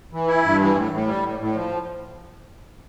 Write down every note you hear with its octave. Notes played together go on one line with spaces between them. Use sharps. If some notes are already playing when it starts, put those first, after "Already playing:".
E3
E4
G2
E3
A2
A2
G3
A2
A2
F3